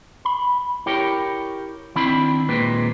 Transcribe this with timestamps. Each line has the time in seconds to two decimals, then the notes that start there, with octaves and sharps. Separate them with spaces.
0.25 B5
0.86 E4 G4 A#4 C#5 G5
1.95 D#3 C4 D4 E4 B5
2.49 D#2 A#2 G#3 C4 B4